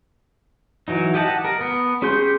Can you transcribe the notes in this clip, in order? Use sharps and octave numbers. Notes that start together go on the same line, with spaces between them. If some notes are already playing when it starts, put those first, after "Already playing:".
E3 F#3 D#4
G4 D#5 F#5 A5
A#4
B3
C#4 G4 G#4 C6 G6